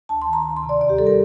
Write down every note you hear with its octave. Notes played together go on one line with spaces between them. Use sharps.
D2 A5
C6
D#3
A#5
D2
C6
C3
D5
D#2 D5
G4
G3 A4
A#4